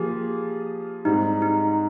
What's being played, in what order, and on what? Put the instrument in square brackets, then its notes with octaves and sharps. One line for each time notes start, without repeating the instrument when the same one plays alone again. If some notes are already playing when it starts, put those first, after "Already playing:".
Already playing: [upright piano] F3 A#3 F4 G#4 [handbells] G4
[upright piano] G#2 G3 C4 [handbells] D#4
[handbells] D#4